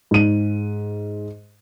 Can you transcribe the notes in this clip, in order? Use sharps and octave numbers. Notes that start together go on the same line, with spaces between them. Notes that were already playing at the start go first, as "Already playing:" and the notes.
G#2 D#7